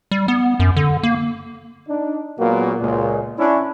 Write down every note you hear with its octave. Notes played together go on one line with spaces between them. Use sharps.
G3
B3
F#2
D3
A#3
D4 D#4
A#2 F#3 G#3 A#3 B3 F#4
C#2 A#2 G#3
C#4 D4 E4